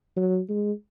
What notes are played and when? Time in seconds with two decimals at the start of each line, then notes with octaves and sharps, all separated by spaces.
0.16 F#3
0.49 G#3